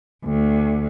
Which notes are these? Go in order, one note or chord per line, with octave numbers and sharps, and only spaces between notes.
D2